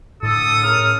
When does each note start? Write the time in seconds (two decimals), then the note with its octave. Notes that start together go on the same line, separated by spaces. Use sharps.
0.23 A2 D3 A4 D#6
0.63 C#3 A#4 F6